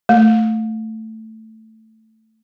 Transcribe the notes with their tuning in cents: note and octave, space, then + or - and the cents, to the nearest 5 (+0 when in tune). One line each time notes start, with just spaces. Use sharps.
A3 +5